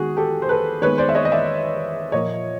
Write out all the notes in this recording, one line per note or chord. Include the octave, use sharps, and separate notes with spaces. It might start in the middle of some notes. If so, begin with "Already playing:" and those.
Already playing: D#3 G#3 B3 F#4 G#4
G4 A4
C5
A4 B4
D#3 G#3 B3 B4 C#5
C5 D5
E5
C#5 D#5
D#5
D5 E5
A#2 F3 A#3 C#5 D#5